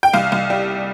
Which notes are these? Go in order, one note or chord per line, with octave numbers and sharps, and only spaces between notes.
G5
C2 F5
C2
G3